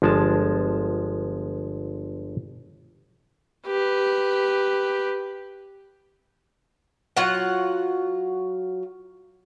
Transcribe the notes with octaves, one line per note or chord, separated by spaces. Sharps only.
G1 F3 G#3 A5
G4 B4
F#3 F4 F#5